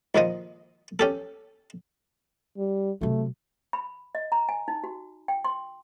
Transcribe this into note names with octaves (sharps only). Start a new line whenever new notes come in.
A#1 D#3 F3 D#5
C#4 G4 A4
G3
C3 F#3 A3
B5
D#5
A#5
G#5
D#4
F#4
G5
C6